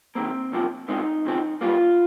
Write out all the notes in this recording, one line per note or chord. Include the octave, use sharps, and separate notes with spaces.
G#2 D#3 A#3 C4
C2 C3 F3 A#3
A#2 G#3 C4 D#4
D#2 C#3 F3 C4
G2 G3 A#3 F4